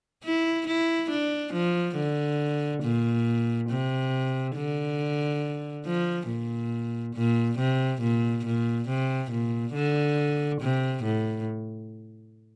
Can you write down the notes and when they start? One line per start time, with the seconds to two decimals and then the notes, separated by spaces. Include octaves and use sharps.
0.23 E4
0.67 E4
1.10 D4
1.53 F3
1.96 D3
2.83 A#2
3.70 C3
4.56 D3
5.86 F3
6.28 A#2
7.15 A#2
7.58 C3
8.01 A#2
8.45 A#2
8.88 C3
9.31 A#2
9.74 D3
10.61 C3
11.04 A2